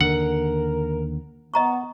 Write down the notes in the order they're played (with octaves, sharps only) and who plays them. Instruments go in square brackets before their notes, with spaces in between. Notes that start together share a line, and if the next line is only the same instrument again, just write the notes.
[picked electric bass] D#2 D3 [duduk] A#4 [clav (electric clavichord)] F#5
[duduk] B3 [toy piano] D#5 A#5 C#6